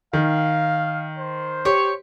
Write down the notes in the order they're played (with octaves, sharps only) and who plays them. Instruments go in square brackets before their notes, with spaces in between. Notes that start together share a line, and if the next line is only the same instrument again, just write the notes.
[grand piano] D#3 [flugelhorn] F5
[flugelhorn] C5
[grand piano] G4 [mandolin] C#5